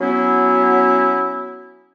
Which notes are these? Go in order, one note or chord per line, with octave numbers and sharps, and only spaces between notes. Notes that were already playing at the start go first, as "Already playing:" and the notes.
F#3 B3 C#4 E4